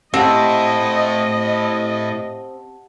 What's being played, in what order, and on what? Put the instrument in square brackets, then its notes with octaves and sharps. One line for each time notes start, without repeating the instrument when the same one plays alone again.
[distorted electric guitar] A2 E4 [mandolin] C4 [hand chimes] G4 F#5 A5 [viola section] D#5